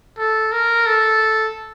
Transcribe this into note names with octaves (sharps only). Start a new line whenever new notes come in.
A4
A#4
A4